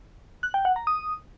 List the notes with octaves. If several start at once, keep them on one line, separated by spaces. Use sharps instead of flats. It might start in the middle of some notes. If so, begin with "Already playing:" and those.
F#6
G5
F#5
A#5
D#6